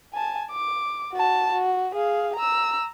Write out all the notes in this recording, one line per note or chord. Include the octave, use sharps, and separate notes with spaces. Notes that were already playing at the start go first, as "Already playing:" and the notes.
G#5 A5
D6
F#4 A5
F#4
G#4 F5
A#5 E6